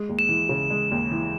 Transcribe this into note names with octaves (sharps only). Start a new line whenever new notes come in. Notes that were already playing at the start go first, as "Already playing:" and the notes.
Already playing: G#3
D#2
E7
E3
C#3
G#3
D#2
E3